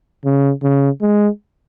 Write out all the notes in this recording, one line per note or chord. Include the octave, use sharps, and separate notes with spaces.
C#3
C#3
G#3